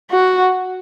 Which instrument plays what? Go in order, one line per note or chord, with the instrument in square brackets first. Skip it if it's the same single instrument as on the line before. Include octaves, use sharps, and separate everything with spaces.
[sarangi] F#4